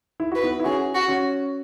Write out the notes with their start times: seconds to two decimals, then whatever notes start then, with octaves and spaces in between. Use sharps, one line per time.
0.20 E4
0.32 F#4 B4
0.43 B3 E4
0.60 E4
0.64 C#4 F#4 G#4
0.94 F#4
1.08 C#4 F#4